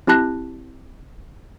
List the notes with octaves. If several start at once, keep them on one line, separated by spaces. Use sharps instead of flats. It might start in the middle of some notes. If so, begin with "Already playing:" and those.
C4 E4 G4 A5 F#6 A#6